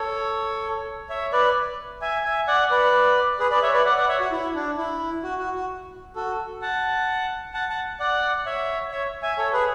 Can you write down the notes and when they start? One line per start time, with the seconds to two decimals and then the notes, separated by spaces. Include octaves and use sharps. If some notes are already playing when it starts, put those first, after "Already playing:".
Already playing: A4 C#5
1.09 C#5 E5
1.32 B4 D5
2.02 E5 G#5
2.25 E5 G#5
2.48 D5 F#5
2.71 B4 D5
3.39 G#4 B4
3.51 B4 D5
3.62 C#5 E5
3.74 B4 D5
3.85 D5 F#5
3.97 D5 F#5
4.08 C#5 E5
4.20 F#4
4.32 E4
4.55 D4
4.78 E4
5.24 F#4
5.39 F#4
5.55 F#4
6.16 F#4 A4
6.62 F#5 A5
7.54 F#5 A5
7.69 F#5 A5
8.00 D5 F#5
8.46 C#5 E5
8.92 C#5 E5
9.23 E5 G#5
9.38 A4 C#5
9.53 G#4 B4